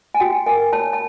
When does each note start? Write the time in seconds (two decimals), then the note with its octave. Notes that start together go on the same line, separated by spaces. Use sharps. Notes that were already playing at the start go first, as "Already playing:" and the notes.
0.14 G#5
0.20 F#4 G5
0.46 A#4 G#5
0.73 C#5 A5
0.93 A5